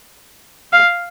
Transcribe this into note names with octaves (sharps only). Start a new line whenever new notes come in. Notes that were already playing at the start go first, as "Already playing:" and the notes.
F5